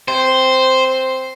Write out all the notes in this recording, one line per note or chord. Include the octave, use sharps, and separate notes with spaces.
C4 C5